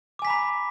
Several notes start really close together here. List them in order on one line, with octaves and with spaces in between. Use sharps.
D6 G#5 B6 A#5 B5